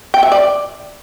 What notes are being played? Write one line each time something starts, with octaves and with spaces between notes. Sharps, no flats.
G5
E5
D5